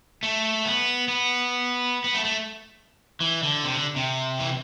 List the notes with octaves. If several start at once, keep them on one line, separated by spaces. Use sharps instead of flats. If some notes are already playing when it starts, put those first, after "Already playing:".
A3
B3
B3
B3
A3
A3
E3
D3
C3
D3
C3
E3